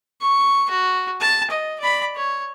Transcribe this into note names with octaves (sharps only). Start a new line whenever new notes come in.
C#6
F#4
A5
D#5
D5 B5
C#5